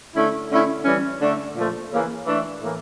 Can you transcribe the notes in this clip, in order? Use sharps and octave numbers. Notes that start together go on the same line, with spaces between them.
D3 A3 C#4 E4
D3 A3 C#4 E4
E3 G3 C#4
D3 A3 D4
A#2 F3 A3
C#3 E3 A#3
E3 A3 D4 A4
A2 E3 A#3